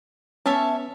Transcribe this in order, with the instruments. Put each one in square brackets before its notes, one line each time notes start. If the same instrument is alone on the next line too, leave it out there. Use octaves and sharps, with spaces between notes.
[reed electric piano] B3 C#4 [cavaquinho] C#5 E5 A5